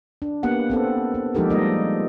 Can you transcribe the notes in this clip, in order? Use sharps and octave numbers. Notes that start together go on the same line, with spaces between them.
D4
A#3 B3 G4 F#5
B3 C4 A4
B3
F3 G#3 D#4 G4 A4 A#4
F3 G3 G#3 A#3 D#4 D#5